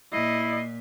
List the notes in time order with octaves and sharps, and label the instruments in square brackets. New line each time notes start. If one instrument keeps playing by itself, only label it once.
[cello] A#2 [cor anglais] E4 [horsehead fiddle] D#5 [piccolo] C7